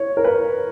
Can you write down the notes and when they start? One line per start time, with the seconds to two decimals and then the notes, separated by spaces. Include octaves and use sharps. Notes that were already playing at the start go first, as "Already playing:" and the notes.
Already playing: C#5
0.17 A#4
0.24 B4